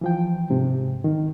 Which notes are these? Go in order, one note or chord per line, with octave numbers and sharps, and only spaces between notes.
E3 F3 G5
G#2 C3
D#3